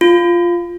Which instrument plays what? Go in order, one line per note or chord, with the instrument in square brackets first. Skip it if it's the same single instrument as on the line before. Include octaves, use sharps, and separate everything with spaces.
[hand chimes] F4